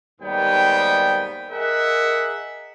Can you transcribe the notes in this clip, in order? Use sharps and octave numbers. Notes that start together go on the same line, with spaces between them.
D#2 G#2 G3 B3 G5
G#4 A#4 D#5 E5 F#5